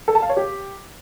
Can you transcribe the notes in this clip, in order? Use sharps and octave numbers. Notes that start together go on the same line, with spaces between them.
A4
A5
F5
C#5
G4